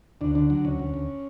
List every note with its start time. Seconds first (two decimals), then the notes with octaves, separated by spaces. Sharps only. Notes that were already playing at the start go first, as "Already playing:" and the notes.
0.21 D2 D4
0.35 D3 D4
0.50 F#3 D4
0.65 D2 C#4
0.80 D2
0.94 D2